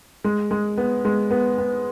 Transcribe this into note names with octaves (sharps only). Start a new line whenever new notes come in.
G#3
G#3
B3
G#3
B3
B3